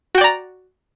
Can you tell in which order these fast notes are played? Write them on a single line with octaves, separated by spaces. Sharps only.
F#4 G5 D5 A#5